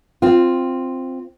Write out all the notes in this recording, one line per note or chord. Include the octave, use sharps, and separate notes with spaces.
C4 F4